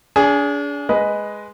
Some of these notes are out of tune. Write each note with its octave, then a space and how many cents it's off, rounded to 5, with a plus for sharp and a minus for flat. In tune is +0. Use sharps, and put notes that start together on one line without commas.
D4 -35 G#4 +0
G#3 +0 B4 +0 D#5 +0